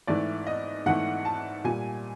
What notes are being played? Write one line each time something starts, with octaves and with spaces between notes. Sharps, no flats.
G#2 E3 A3 D5
D#5
G#2 E3 A3 F#5
A5
A#2 G3 G#5